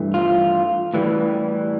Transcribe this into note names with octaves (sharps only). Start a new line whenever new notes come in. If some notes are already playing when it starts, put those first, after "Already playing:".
Already playing: G2 E3 A3
F4
A2 E3 G3